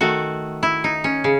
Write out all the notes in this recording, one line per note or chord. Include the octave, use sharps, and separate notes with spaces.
D#3 A3 F#4
E4
D#4
C#4
C#3